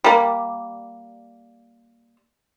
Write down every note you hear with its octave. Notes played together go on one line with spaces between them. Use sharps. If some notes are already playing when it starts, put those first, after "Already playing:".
G3 A#3